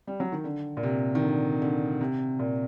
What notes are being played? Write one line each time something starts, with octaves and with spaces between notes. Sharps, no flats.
G3
F#3
D#3
D3
A#2
C3
D#3
D3
D3
C3
A#2